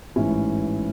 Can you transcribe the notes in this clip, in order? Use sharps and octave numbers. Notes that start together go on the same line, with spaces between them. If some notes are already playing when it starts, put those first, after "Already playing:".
A1 G#2 E3 C#4 E4